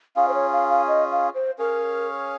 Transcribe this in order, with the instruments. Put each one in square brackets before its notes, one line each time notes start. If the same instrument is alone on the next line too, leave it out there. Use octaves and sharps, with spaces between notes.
[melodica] C#4 F4 G#4 [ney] F5
[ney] C5
C#5
F5
F5
D#5
F5
C5
[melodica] C#4 G#4 C#5 F5 [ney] A#4